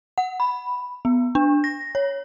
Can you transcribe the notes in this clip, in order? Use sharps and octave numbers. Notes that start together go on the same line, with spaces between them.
F#5
B5
B3
D4
A#6
C#5